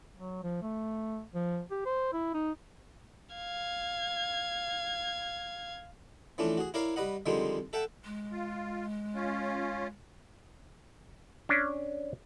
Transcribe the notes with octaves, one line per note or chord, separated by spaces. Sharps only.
F#3
F3
A3
F3
G4
C5
E4
D#4
F5 G#6
E3 F3 A3 C#4 D4
F#4 G#4
E4 A#4 C#5 D5 F5
G3 B4 D#5 F#5
D3 D#3 F3 G3 G#3 C4
A4 E5 F#5 G5 A5
G#3
F4
C#4 F4
C#4 D4